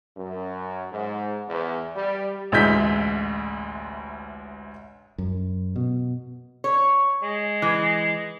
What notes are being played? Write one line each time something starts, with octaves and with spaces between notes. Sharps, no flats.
F#2
G#2
E2
G3
A1 D2 G#3 E4 G6 B6
F#2
B2
C#5
G#3
E3